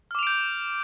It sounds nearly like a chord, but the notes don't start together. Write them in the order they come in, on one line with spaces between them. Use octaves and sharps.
F6 D6 F7 D7 G6